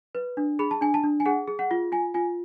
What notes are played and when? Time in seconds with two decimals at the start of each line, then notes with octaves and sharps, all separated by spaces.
0.15 B4
0.37 D4
0.59 G#4 B5
0.71 A5
0.81 D4 G#5
0.94 A5
1.03 D4
1.20 G#5
1.26 G#4 F#5
1.48 G#4
1.59 F#5
1.71 F4
1.92 F4 G#5
2.14 F4 G#5